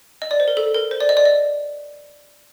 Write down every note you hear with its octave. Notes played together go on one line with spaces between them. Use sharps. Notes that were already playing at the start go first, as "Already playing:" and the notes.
D#5
D5
C5
A#4
A4
A#4
C5
D5
D#5
D5
D#5